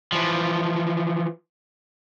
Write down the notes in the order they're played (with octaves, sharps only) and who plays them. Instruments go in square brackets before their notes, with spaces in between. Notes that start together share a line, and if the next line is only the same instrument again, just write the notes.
[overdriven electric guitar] E3 F3